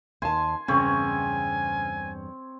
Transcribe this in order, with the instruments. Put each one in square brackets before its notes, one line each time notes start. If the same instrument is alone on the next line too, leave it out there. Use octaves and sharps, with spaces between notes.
[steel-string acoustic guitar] D#2 A5 [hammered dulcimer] G#5 C6
[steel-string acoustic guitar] E2 G2 [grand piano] C#3 [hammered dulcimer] C4 C#5 [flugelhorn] G#5